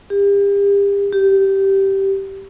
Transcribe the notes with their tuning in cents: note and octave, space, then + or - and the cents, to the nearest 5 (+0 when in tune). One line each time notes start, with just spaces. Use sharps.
G4 +35
G4 -15